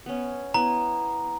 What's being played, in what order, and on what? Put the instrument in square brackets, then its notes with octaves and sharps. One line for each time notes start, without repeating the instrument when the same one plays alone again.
[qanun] B3 C#4
[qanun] B3 E4 [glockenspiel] A#5